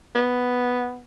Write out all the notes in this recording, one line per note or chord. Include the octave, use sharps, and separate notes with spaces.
B3